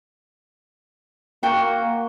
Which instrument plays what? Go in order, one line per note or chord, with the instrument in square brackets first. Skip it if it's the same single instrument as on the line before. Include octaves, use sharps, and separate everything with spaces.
[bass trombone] A#3 [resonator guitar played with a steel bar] F#4 G5